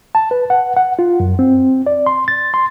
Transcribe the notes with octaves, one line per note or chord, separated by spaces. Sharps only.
A5
B4
F#5
F#5
F4
F#2
C4
D5
C6
A6
C6